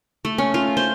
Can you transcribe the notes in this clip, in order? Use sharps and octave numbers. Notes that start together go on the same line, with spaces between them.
A3
C#4
F4
C5